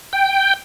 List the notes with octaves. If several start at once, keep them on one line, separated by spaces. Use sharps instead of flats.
G5